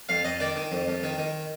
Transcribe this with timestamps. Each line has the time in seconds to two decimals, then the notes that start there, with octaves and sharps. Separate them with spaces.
0.09 F2 F5
0.25 F2 D#5
0.40 D#3 D5
0.56 D#3
0.72 F2
0.87 F2
1.03 D#3
1.18 D#3